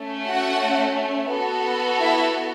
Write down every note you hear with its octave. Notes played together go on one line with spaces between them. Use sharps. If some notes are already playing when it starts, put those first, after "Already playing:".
Already playing: A3 C#4
F#4 F#5
B3 F#4 A4
E4 E5